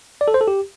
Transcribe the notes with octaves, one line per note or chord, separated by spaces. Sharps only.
D5
A4
C5
A4
G4